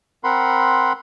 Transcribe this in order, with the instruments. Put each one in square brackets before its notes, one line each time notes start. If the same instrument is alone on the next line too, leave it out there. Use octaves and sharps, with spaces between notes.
[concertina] C4 A#4 F#5 B5 C6